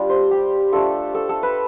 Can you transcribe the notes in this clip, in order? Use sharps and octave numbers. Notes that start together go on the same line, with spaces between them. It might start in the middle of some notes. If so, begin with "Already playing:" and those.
Already playing: G3 D4 F4
C5
G4
A3 D4 F4 A4
A4
A4
B4